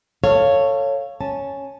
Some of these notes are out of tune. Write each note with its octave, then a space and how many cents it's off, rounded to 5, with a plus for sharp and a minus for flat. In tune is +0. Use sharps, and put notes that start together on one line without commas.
A4 +20 C#5 +0 F5 +0
C#4 +0 A5 +0